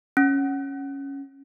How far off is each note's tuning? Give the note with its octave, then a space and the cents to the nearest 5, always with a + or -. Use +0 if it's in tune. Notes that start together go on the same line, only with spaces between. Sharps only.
C#4 -5